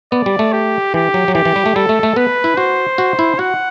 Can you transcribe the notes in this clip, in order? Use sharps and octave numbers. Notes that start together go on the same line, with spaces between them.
B3 D5
G3
A3
G4
E3 G4
F#3
F#3
E3 G4
E3
G3
A3
G3 A4
A3
A3
B3 B4
E4
F#4 C5
F#4
E4
F#4 F#5